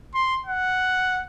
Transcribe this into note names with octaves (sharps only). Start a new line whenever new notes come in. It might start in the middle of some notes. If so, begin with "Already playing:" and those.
C6
F#5